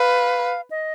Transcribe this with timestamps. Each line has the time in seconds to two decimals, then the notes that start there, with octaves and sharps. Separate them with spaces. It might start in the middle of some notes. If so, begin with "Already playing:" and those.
Already playing: B4 F5
0.71 D#5